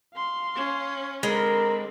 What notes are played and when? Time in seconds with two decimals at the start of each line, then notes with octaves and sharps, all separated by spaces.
0.14 F5 C6
0.55 C#4
1.23 D3 G#3 C4 A#4 B5